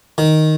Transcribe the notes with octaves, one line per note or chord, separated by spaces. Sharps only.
D#3